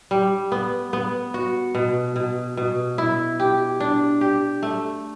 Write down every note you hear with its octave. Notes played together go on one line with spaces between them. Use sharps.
G3
B3
B3
F#4
B2
B2
B2
E4
G4
D4
G4
A3